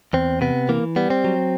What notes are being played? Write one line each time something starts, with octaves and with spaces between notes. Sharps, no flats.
E2 C4
C3 B3
E3 A#3
G3 B3
C4
F#3